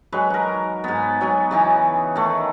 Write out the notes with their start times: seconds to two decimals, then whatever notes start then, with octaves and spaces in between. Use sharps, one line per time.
0.12 F#3 G#3 B4
0.30 D#4 A#4
0.84 G#2 B3
1.21 F#3 B3 G#5
1.51 C#3 E3 D#4
2.16 D#3 A3